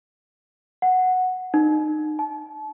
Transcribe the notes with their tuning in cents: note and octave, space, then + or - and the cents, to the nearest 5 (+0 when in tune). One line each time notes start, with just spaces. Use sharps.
F#5 -5
D#4 -25
A5 -30